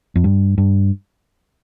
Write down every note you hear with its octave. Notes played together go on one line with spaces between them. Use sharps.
F2
G2
G2